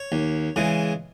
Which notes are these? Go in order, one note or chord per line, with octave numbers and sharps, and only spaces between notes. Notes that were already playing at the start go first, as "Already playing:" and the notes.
Already playing: C#5
D#2
C#3 E3 G#3